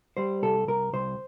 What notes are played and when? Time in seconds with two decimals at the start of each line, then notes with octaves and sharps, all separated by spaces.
0.17 G3 C5
0.42 C2 A4
0.68 C2 A#4
0.93 C2 C5